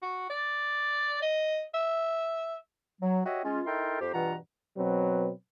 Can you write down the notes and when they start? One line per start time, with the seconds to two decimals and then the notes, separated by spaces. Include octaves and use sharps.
0.02 F#4
0.30 D5
1.22 D#5
1.74 E5
3.02 F#3
3.26 F#4 G4 C#5 D#5 E5
3.44 G#3 C#4 F4
3.66 D#4 E4 A4 A#4 G5 C6
4.01 F2 G4 C5
4.14 G2 B2 E3 F4 F#5 A#5
4.76 B2 F#3 C4 B4